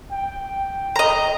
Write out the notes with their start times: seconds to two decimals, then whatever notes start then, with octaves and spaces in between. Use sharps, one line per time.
0.12 G5
0.96 D#5 A#5